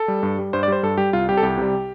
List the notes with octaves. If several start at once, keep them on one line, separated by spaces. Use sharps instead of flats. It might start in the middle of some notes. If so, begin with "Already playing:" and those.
Already playing: A4
G3
G2
G3
G2 C5
D5
G3 C5
G2 A4
G3 G4
C2 F4
C3 G3 G4
A4
C2 G4
C3 G3